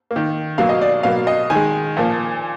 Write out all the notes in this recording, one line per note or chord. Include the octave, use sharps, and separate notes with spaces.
A#3
D#3
B2 F#3 A#3 F5
D#5
D5
B2 F#3 A#3 F5
D#5
D#3 G#5
G#3
A#2 F3 A#3